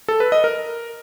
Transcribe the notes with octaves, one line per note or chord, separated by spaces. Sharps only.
A4
B4
D#5
A#4